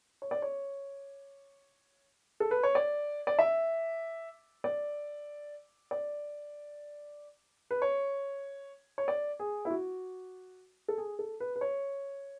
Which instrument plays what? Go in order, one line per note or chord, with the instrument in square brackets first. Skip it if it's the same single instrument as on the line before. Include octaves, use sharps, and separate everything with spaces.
[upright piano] C#5
D5
C#5
A4
B4
C#5
D5
D5
E5
D5
D5
B4
C#5
C#5
D5
G#4
E4
F#4
A4
G#4
A4
B4
B4
C#5